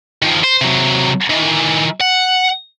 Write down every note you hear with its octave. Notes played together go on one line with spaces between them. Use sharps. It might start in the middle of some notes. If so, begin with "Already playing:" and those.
D#3 F3
C5
C3 F#3
D#3 E3
F#5